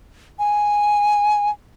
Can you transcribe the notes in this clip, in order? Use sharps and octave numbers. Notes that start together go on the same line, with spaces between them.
G#5